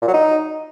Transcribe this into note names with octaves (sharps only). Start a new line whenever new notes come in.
A#2
F#3
D#4